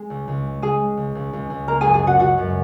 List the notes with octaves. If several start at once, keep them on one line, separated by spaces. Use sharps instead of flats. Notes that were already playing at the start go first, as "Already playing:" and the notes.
Already playing: G#3 G#4
C#2
C#2
G#3
C#2 G#4 G#5
G#3
C#2
C#2
C#2
C#2
A#3 A#4 A#5
G#4 G#5
F#2
G#4 G#5
C#3 F#4 F#5
C#3 F#4 F#5
F#2